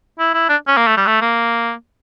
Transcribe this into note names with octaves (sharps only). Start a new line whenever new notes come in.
E4
E4
D4
C#4
A#3
A3
G3
A3
A#3